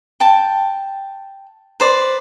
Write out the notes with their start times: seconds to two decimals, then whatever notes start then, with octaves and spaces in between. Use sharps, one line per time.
0.20 G5 A5
1.80 B4 C5 D5